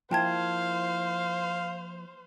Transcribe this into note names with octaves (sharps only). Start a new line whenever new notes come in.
F3 A#3 E4 C5 F5 G5 A5 G#6